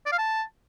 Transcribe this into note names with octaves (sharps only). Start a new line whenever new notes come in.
D5
F5
A5